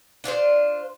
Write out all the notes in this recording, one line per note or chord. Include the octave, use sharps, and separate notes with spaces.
D4 F4 B4 C5